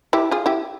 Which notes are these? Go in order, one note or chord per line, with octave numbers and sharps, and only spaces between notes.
E4 G4
F4 G#4
E4 G4